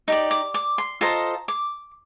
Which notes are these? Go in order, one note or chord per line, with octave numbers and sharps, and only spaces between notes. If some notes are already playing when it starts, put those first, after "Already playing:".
D#4 G4 D5
D6
D6
C6
F4 A4 C5 D#5 A#5
D6